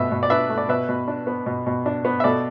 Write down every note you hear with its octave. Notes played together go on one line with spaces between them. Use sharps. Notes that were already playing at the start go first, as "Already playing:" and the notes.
Already playing: B2 A3 B4 E5
B2
D5
D4 B4 E5
A3
D5
B2 B4 E5
B2
D4
B3
B2
B2
D4
B3
E5
B2 A4 D5